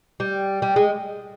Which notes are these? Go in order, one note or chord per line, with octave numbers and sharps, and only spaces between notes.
G3
G3
G#3